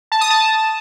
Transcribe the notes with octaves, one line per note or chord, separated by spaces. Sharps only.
A5
D#6
A5